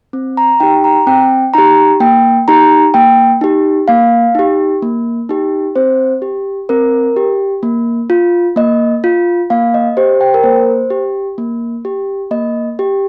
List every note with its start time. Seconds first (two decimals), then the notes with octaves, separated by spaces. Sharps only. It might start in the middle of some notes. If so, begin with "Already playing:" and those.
0.13 C4
0.37 A#5
0.60 D#4 G4 G5
0.84 A#5
1.07 C4 G5
1.54 D#4 G4 A#5
2.00 A#3 G5
2.48 D#4 G4 A#5
2.94 A#3 G5
3.41 D#4 G4
3.88 A#3 F5
4.35 D#4 G4
4.83 A#3
5.29 D#4 G4
5.76 C4 C5
6.22 G4
6.69 C4 A#4
7.16 G4
7.63 A#3
8.10 F4
8.56 A#3 D#5
9.04 F4
9.50 A#3 F5
9.74 D#5
9.97 G4 C5
10.21 G5
10.34 A#4
10.44 A#3 C5
10.90 G4
11.38 A#3
11.85 G4
12.31 A#3 D#5
12.79 G4